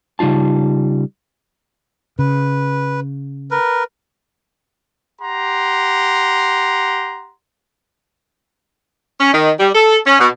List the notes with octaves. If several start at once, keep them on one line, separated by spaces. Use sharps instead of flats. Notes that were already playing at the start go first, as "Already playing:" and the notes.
C#3 G3 D#4 F4 A5
C#3 B4
A#4 B4
G4 F#5 A#5 C6
C#4
D#3
G3
A4
C#4
B2